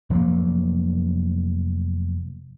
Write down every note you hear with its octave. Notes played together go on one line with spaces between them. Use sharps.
F1 F3 F#3 A#3